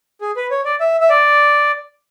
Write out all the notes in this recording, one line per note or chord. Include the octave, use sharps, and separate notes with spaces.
G#4
B4
C#5
D5
E5
E5
D5